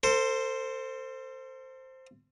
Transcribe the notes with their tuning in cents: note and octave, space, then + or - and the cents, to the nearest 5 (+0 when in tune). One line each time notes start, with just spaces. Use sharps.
A4 +45 C5 +0